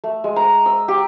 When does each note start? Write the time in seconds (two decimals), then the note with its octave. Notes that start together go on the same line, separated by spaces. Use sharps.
0.04 A3
0.24 G#3
0.36 A#5
0.66 E6
0.88 G4